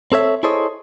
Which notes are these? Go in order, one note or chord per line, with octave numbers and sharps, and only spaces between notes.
C4 A4 C#5 E5
E4 G#4 A4 C5 C#5 D#5